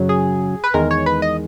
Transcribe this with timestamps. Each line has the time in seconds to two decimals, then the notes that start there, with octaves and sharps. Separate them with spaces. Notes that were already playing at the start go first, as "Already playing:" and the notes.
Already playing: F#2 C#3 F#3
0.09 G#4
0.64 B4
0.74 E2 D#3 G#3 A#4
0.91 C#5
1.06 B4
1.22 D#5